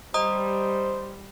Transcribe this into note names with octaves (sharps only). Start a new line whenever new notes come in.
G3 C5 D#5 A#5 D#6